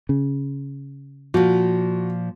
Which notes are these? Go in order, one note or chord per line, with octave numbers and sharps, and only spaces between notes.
C#3
A#2 F3 F#4